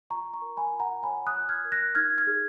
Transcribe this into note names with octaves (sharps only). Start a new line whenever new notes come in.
F4 A#5 C#6
A#5 C#6
A#4
G#5 B5
F4
F#5 A#5
C#5 G#5 B5
D#6 F#6
F4
F6 G#6
A#4
F#6 A#6
D#4 F6 G#6
F6 G#6
G#4